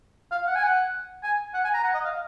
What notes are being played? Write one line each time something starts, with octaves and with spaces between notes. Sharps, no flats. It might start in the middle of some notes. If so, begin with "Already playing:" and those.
F5
F#5
G#5
F#5
G#5
F#5
G#5
A#5
F#5
D#5
F5